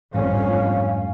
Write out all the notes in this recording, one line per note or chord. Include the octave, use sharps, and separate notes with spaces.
G1 F2 G#2 G3 A3 C#4 F5